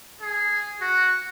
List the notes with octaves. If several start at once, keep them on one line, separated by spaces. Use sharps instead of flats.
G#4
F#4